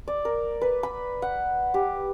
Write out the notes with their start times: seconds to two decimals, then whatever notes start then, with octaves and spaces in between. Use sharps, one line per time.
0.08 D5
0.25 A#4
0.61 B4
0.83 B5
1.22 F#5
1.74 G4